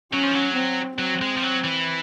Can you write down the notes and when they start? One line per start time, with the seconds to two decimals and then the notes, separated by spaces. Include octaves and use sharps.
0.13 F#3 C#4
0.23 F3
0.34 F#3
0.56 C4
0.99 F#3 C4
1.21 G#3
1.37 F3
1.43 F#3
1.64 E3